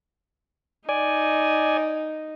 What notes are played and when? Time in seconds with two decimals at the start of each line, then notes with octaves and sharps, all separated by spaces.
0.89 D#4 D5 G#5